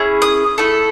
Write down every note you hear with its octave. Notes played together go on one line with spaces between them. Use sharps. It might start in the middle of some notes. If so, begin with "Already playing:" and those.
Already playing: C#4 E4 G#4
D#6
A3 E4 A4